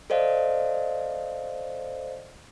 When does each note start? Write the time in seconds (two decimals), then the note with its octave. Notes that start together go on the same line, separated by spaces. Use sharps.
0.10 A4 C5 D5 D#5 F5